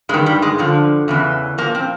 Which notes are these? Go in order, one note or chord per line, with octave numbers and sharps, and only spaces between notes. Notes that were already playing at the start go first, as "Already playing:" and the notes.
G2 D#3 G#3
G3
G#3
G2 D3 F3
E2 C#3 E3
A#2 F3 A#3
C4